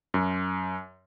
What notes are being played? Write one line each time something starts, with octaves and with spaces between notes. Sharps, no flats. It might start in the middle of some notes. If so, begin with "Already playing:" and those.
F#2